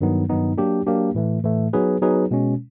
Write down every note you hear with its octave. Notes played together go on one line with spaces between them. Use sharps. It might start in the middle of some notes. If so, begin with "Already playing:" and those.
G2 D#3 F#3 B3 D#4
G2 D#3 F#3 B3 D#4
F#3 A#3 D4 G4
F#3 A#3 D4 G4
A2 E3 A3
A2 E3 A3
F#3 B3 D#4 G#4 B4
F#3 B3 D#4 G#4 B4
B2 G#3 C#4